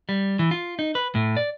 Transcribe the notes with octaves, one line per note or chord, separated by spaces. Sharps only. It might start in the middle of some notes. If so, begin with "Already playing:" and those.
G3
E3
F4
D#4
B4
A2
D5